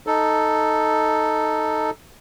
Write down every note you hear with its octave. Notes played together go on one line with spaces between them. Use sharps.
D#4 A4